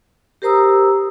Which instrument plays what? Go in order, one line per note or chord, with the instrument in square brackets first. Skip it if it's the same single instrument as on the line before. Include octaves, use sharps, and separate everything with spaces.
[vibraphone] G4 A#4 C5 A#5 D#6 E6